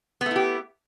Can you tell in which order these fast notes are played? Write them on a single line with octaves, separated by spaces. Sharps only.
B3 A3 E4 G4